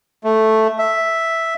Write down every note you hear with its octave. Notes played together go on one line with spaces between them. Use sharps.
A3
E5